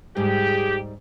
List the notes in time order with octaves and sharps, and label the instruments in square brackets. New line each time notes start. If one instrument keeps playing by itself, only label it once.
[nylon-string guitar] G#2 G3 [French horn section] G4 G#4